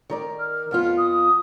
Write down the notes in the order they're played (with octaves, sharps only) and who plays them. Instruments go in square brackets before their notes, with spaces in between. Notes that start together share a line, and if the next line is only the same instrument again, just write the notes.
[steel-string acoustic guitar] D#3 A#4 D5
[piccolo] F6
[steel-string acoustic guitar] F2 B3 F4
[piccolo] D#6